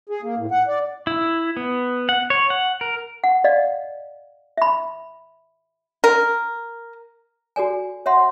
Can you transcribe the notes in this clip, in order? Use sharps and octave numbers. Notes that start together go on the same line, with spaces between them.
G#4
A#3
A2
F#5
D5
E4
B3
F#5
C#5
F#5
A#4
F#5
D5 D#5 F5
E5 B5
A#4
F#4 A4 D5 G#5
C#5 E5 F#5 C6